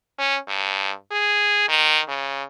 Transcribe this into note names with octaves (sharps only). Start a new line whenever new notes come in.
C#4
G2
G#4
D#3
C#3